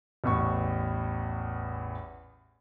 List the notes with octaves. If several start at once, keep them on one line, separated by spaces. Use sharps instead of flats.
A1 E2 C#6